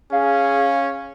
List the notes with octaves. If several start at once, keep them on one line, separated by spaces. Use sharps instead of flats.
C#4 G#4 F5